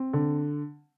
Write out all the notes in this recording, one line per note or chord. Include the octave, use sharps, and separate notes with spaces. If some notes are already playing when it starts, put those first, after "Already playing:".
Already playing: C4
D3